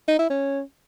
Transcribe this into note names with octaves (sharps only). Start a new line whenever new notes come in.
D#4
E4
C#4